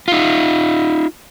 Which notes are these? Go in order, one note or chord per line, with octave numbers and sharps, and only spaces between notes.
D#4 F4